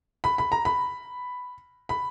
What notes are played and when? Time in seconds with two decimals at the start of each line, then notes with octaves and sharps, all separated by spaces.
0.24 B5
0.38 B5
0.52 A#5
0.65 B5
1.89 B5